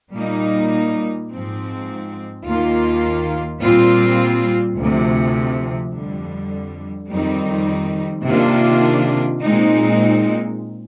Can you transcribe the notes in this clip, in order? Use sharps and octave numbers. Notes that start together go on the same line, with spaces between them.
A#2 G3 A#3 D#4
G#2 F3 C4
D#2 D#3 A#3 F4
A#2 G3 C4 F4
D2 C3 F3
F2 D3 G3
F2 D#3 G3 C4 D#4
C3 D#3 A#3 D4 F4
A#2 G#3 C4 D#4